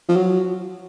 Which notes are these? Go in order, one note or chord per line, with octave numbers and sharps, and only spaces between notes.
F3
F#3